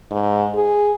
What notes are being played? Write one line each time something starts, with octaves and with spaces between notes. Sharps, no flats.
G#2
G#4